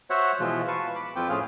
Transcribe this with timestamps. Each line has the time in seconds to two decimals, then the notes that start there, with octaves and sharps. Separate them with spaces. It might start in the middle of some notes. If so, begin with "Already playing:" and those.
0.10 F#4 C5 C#5 E5 F#5
0.40 B2 E3 F3 G#3 F4
0.68 B4 F5 A5 C#6
0.95 B5 D6
1.16 F2 C4 F4 B4 G5 D6
1.29 A2 F3 C#4 F4 G#4 F6